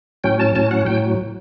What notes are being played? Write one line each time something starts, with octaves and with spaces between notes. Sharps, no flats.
A2 F#3 C#4 G5
A5
A2 F#3 C#4 A5
F#5
A2 F#3 G5